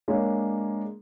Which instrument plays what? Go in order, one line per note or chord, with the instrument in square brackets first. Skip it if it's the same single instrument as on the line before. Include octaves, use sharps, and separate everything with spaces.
[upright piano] G#3 A#3 D4 C#5